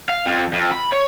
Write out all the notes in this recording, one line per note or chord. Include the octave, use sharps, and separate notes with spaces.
F5
F2
F2
B5
C#5